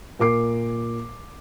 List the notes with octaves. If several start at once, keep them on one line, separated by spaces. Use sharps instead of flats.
A#2 A#4 D6 C7